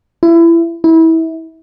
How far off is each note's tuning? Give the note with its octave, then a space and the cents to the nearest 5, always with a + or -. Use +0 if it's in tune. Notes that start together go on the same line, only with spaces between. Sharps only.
E4 +25
E4 -25